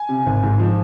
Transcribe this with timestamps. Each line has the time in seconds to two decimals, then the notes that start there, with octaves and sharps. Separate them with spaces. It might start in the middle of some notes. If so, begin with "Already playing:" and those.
Already playing: G#5
0.09 C3
0.26 G#1
0.43 G#2
0.59 F3